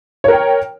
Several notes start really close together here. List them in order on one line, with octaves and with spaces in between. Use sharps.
C#5 A#4 G5